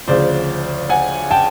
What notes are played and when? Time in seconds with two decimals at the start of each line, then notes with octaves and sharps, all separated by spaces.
0.08 D2 C#3 F3 C5 D5
0.89 F#5 G#5
1.31 G5 A5